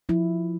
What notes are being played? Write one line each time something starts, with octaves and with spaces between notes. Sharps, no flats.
F3 E4